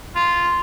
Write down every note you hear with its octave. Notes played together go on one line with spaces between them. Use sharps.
F4